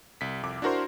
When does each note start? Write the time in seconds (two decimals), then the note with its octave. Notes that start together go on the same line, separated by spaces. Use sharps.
0.21 C2 B6
0.43 C2 F2 D6
0.62 D4 E4 F#4 A#4 C5 C6